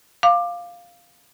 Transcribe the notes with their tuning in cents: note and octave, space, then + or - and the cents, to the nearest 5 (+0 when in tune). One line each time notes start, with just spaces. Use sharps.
F5 +0 D6 +20